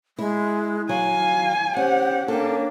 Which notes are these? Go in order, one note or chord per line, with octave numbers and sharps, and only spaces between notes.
G#3 E4
F#3 F5 G#5
C#4 G4 C5 F#5
A#3 C#4 D4 A4 G5